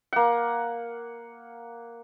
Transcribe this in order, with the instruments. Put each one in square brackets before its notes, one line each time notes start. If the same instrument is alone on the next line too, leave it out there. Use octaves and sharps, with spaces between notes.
[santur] A#3 F#5